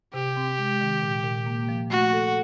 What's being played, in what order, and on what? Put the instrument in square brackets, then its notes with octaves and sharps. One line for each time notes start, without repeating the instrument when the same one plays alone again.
[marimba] C3 [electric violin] G4
[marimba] C4
G#3
D#3
A#2
A#2
A#3
F3
[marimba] A3 [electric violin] F#4
[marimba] A4